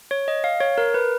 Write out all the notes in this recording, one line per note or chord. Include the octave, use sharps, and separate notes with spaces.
C#5
D#5
F5
C#5
A#4
B4